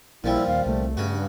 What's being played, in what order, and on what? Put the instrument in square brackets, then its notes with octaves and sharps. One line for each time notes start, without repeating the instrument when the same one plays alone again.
[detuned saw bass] A#1 [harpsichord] A#2 F3 G3 [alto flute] E4
[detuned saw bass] D#2 [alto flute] F5
[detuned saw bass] C2 [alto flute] A3
[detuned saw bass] G2 [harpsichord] C#3 F#4